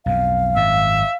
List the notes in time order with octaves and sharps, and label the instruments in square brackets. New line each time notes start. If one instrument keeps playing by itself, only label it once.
[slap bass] B1 F2 [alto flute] F5
[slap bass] G#1 F#2 [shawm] E5